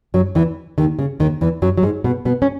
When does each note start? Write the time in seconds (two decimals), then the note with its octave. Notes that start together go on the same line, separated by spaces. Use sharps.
0.14 F#2 F#3
0.35 E2 E3
0.78 D#2 D#3
0.99 C#3
1.20 D#2 D#3
1.41 E2 E3
1.62 F#2 F#3
1.78 F#3
1.83 G#2 G#3
2.04 B2 B3
2.25 B2 B3
2.42 C#4